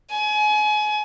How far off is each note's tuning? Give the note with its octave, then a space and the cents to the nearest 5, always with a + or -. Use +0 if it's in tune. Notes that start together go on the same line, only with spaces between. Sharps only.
G#5 +30